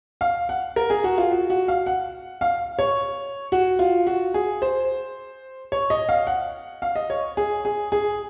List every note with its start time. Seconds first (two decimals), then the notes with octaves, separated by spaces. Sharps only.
0.21 F5
0.49 F#5
0.76 A#4
0.90 G#4
1.04 F#4
1.18 F4
1.31 F#4
1.50 F#4
1.68 F5
1.86 F#5
2.41 F5
2.79 C#5
3.52 F#4
3.79 F4
4.07 F#4
4.34 G#4
4.62 C5
5.72 C#5
5.90 D#5
6.09 F5
6.27 F#5
6.82 F5
6.96 D#5
7.10 C#5
7.37 G#4
7.65 G#4
7.92 G#4